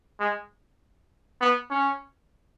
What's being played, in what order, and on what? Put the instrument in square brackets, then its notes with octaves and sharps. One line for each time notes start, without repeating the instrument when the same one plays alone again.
[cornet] G#3
B3
C#4